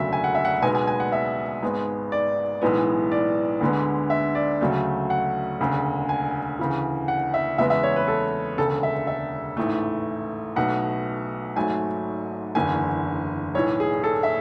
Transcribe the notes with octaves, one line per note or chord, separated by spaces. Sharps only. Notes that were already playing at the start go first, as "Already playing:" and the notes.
Already playing: E1 D2 C#3 F#3 A3 E5
G#5
F#5
E5
F#5
B1 B2 G#3 B3 G#5
G#5
G#5
F#5
E5
G#1 G#2 G#3 B3
D5
B1 A2 E3 G#3 B3
D5
D2 D3 G#3 B3
E5
D5
D2 C#3 F#3 A3
F#5
E1 D2 C#3
G#5
D2 C#3 E3
F#5
E5
E2 C#3 G#3 B3 E5
E5
C#5
B4
A4
E1 D2 C#3 A4
E5
E5
A1 G#2 E3 A3
B1 B2 A3 F#5
G#1 G#2 F#3 A3 G#5
F#1 E2 D3 G#5
B1 A2 E3 C#5
G#4
A4
E5